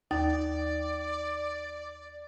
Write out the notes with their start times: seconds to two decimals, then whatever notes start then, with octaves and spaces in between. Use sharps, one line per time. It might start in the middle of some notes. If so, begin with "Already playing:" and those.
0.11 D#2 D#4 D5 A6